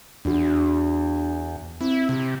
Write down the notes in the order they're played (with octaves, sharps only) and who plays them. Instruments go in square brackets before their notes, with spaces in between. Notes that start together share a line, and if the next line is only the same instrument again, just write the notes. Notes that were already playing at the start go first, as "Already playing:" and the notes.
[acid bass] E2 [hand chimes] D4 F#4
[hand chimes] C4 [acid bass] E4
[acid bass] C3